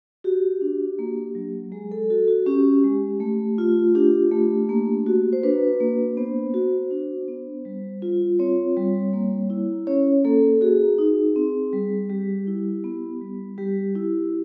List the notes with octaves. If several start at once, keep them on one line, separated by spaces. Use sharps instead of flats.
F#4 G4
D4
A#3
F#3
G#3 G#4
A4
F#4 A4
F#4
C#4 G4
G#3
A3
F4
D4 G4
A3
A#3
F#4
C5
D4 B4
A#3
B3 C5
F#4
D4
B3
G3
F4
C4 C#5
G3
A#3
E4
C#4 C#5
A#3 A4
F#4 G#4
D#4
C4
G3
G3 G4
E4
B3
G3
G3 G4
E4